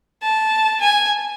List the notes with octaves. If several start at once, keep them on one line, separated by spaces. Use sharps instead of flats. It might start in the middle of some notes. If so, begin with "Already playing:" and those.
A5
G#5